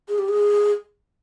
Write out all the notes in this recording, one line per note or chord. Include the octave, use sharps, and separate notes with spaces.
G#4
G4
G#4